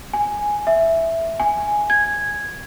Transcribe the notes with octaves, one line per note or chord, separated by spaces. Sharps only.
G#5
E5
G#5
G#6